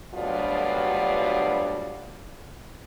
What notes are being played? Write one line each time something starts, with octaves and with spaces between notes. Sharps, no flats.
D2 G2 B2 F#3 F4 D5